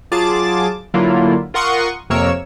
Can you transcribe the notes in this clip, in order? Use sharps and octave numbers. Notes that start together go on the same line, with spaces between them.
F#3 F4 G#4 A5 D6 A6
D3 F#3 A#3 D4 E4 F4
F4 A#4 F#5 C6 C#6 D#6
F2 C3 A#3 A#4 C#5 E6